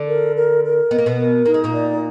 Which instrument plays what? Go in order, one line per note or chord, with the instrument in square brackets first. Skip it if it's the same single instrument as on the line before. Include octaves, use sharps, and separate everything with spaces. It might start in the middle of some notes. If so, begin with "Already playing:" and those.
Already playing: [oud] D3 D4
[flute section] A#4
A#4
A#4
[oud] B3 [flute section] D#5
[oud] A#3
B2 B3
[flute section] A#4
[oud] A#3 [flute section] D#4
[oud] G#3
A#2 A#3
[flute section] D5